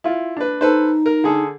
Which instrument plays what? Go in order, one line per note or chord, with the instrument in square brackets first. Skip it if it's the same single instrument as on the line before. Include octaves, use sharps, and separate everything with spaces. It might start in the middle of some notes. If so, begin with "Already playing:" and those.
[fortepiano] E4 F4
D4 B4
[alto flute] D#4 [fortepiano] A4 B4 C5
[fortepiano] A#4
D3 G#4 A4